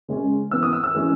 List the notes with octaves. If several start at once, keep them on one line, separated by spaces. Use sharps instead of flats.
C#3 G#3 C#4
E3 B3 E6
D#6
E6
E6
E3 G#3 C#4